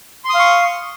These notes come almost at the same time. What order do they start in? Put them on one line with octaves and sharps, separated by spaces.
C6 D#6 F5 C#6